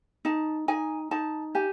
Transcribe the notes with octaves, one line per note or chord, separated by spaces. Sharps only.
D#4 A5
D#4 G#5
D#4 A5
G4 G#5